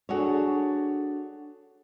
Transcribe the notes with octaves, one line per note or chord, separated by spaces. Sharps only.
D4 F#4 G#4 A4 C#5